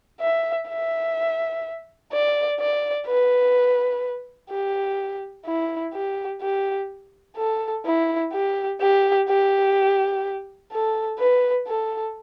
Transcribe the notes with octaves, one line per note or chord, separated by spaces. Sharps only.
E5
E5
D5
D5
B4
G4
E4
G4
G4
A4
E4
G4
G4
G4
A4
B4
A4